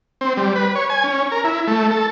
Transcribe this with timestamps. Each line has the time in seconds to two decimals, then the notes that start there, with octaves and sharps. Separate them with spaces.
0.21 C4
0.37 G3
0.56 B4
0.75 C#5
0.90 G#5
1.04 C#4
1.32 A#4
1.44 E4
1.67 A3
1.91 A4